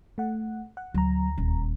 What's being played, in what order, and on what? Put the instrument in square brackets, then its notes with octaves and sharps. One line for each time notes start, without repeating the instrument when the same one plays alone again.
[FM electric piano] A3 F#5
F#5
[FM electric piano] D2 A#5 [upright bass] F#3
[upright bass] D#1